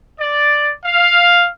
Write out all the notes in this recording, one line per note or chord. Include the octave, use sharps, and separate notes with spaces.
D5
F5